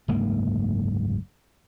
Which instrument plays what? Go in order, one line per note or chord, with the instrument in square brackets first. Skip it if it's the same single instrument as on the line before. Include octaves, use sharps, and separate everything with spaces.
[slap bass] F#1 D2 G#2 A#3